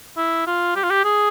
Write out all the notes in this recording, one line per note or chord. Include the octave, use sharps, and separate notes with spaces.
E4
F4
G4
F4
G4
G#4